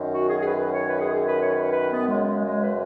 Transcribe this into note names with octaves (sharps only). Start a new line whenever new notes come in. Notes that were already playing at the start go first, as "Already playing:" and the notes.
Already playing: F#2 D#3
F#4
G#4
G#4
B4
B4
C#5
B4
G#4
G#4
B4
C#5
B4
B4
B3
F#2 C#3 G#3
G#3
G#3
B4